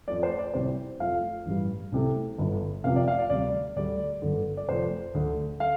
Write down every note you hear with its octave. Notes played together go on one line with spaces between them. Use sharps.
F2 F3 A3 D5
C5
D5
C2 C3 G3 C5
F2 F3 A3 F5
A1 G2 G3
C2 C3 A3
G1 G2 D3
F1 F2 C3 F3 F5
D5
F5
D5
D2 C3 G3 D5
D2 D3 G3 D5
G1 G2 D3
D5
F1 F2 F3 A3 C5
D2 D3 A3
A3 F5